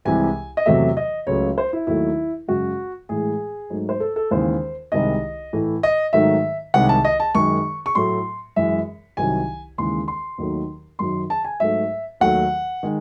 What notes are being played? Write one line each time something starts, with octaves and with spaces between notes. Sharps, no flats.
C2 C3 E3 G#3 G#5
D#5
E2 C3 F#3 A3 E5
D#5
C#2 C#3 F#3 A3 C#5
C5
E4
D#2 D#3 F#3 A3 E4
F#2 C#3 G#3 F#4
A2 E3 G#3 G#4
G#2 F#3 A3
C5
A4
A4
D#2 C#3 E3 G#3 C5
C2 C3 D#3 G#3 D#5
A2 E3 A3
D#5
G#2 D#3 F#3 A3 E5
C2 C3 D#3 G#3 F#5
A5
D#5
A5
F#2 D#3 G#3 C#6
C#6
A2 F#3 A3 C6
F#2 E3 G#3 E5
C2 C3 D#3 F#3 G#5
D#2 C#3 E3 G#3 C6
C6
D#2 D#3 F#3 A3
F#2 D#3 F#3 C6
A5
G#5
G#2 F#3 A3 E5
D#2 D#3 F#3 A3 F#5
D#3 G#3